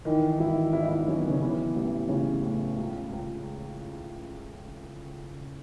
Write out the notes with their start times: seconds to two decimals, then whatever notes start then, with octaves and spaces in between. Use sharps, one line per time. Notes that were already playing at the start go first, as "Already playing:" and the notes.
0.05 D#3 E3 D#4
0.31 D#4
0.39 G#1 E3 E4
0.73 G#1 E4
0.80 D#4
0.88 E3 E4
1.07 F#2 C#4
1.17 B3
1.29 C#3 C#4
1.41 E3 B3
1.75 A1 B3
2.09 A1 C#3 C#4
2.43 A2
2.78 C#2
3.12 C#2